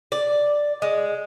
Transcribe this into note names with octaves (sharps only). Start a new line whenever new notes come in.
D5
G#3